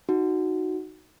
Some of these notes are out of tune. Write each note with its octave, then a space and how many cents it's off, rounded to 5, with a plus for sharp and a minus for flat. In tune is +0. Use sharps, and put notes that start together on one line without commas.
D#4 +0 F#4 +0